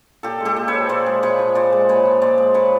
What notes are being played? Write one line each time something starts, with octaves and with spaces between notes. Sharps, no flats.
A#2 G4 A4
G#3
G4 A4
A#2
B4 C#5
F3
A#2 C5 D5
G#3
A#2 B4 C#5
F3
A#2 C5 D5
G#3
A#2 B4 C#5
F3
A#2 C5 D5
G#3
A#2 B4 C#5